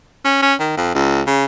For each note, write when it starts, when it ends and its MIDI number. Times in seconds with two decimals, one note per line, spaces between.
0.25 0.41 61
0.42 0.54 61
0.60 0.73 51
0.77 0.93 41
0.95 1.21 37
1.27 1.45 49